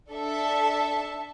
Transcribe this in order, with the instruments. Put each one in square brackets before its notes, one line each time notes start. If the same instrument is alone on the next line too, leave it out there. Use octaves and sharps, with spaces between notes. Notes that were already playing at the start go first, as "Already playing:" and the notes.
[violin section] D4 A4 E5 A5